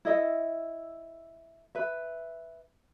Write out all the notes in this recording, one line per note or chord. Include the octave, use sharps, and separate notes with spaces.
E4 A4 D#5 E5
B4 E5